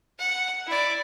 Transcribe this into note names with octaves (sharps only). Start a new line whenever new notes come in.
F#5
E4 D5